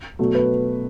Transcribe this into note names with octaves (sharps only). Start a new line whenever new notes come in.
B2 F#3 A3
B4